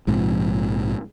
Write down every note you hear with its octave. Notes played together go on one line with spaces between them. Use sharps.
A#1 G#2 C3 F3